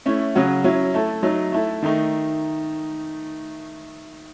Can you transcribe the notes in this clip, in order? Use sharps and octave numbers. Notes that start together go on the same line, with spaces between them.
A3 C#4 E4
C#3 F#3 C#4 F#4
F#3 C#4 E4
A3 E4 A4
F#3 A3 D#4
A3 E4 A4
D#3 A3 D#4